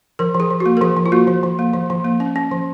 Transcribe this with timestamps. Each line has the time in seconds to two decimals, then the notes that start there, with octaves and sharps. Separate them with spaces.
0.19 F3 A#4
0.34 F3
0.40 G#4
0.50 F3
0.60 F#4
0.66 A#3
0.77 A#4
0.81 F3 G#4
0.97 F3
1.06 F4
1.12 A#3 F#4
1.27 F3
1.43 F3
1.59 A#3
1.73 F3
1.90 F3
2.05 A#3
2.20 C#4
2.36 C#4
2.51 F3